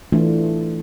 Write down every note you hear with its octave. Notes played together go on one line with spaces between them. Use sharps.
E3 A3 D4 F4